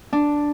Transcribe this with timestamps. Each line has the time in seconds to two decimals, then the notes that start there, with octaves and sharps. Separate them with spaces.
0.13 D4